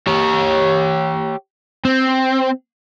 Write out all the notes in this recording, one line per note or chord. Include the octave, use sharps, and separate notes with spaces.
G4 C#5
C4